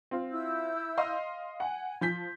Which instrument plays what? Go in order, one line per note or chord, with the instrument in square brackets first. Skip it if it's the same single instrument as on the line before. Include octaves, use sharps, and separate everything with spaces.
[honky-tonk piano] C4 F4
[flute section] E4 E6 G6
[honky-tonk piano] D#5 F5 C6
[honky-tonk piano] F#5 [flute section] G#5
[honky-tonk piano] F3 G6 B6